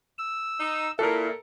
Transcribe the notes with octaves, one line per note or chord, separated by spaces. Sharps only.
E6
D#4
A#2 E4 A4 A#4